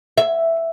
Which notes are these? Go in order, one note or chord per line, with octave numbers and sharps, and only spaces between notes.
E5